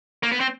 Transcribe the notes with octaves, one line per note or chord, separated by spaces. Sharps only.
A#3
B3
C4